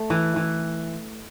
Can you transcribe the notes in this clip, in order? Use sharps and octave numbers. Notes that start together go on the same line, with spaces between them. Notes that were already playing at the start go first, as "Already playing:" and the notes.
Already playing: A3
E3
E3